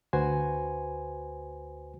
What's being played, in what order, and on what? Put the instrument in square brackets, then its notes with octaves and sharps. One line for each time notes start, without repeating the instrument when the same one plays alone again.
[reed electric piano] D2 F#4 B4 C5 G#5